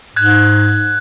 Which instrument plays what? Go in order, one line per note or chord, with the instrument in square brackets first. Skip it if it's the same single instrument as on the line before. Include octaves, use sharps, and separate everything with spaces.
[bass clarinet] G#2 [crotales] F#6 G#6